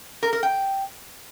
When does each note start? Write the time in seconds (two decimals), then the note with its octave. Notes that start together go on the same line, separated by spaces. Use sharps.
0.23 A#4
0.33 A#4
0.43 G5